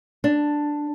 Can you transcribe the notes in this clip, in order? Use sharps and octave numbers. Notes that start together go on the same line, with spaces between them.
D4